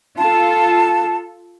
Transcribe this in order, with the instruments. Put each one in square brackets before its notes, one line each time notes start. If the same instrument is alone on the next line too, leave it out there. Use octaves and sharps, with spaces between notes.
[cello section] F4 A4 [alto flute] A5